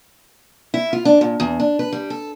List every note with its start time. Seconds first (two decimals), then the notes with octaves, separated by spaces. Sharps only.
0.74 E4
0.93 F4
1.05 D4
1.21 A#2
1.40 E2
1.60 D4
1.79 B4
1.93 G3
2.10 A4